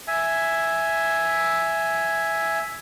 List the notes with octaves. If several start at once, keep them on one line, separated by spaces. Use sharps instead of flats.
E5 G#5